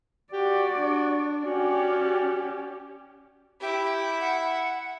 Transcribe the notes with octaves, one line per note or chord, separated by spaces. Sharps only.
F#4 G4 D5
D4
C#4 F#4 G4 D5
E4 G4 E5
F#5